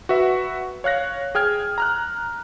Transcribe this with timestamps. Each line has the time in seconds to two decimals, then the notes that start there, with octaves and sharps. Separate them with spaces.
0.09 F#4 B4 E5
0.84 C#5 F5 F#6 A#6
1.35 G#4 G5 F6 G#6
1.78 A#5 F6 F#6